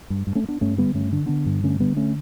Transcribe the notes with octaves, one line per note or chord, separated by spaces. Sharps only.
G2
G2
A3 C#4
G2
B3 D4
G2 A3 C#4
D3 G3 B3
G2 A3 C#4
D3 D4
D3 B3 D4
G2
D3 A3 C#4
D3 G3 B3
A3 C#4